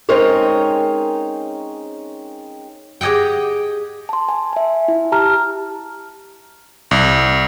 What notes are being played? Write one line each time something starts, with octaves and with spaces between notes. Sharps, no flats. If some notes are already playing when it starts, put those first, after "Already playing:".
G#3 C4 C#4 D#4 A#4 C#5
G4 G#4 D#5 F#5 G5
A5 C6
G#5 A5
E5 G#5
E4
G4 A5 A#5 F6
C2